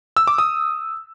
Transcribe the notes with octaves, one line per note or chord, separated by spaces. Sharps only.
E6
D6
D#6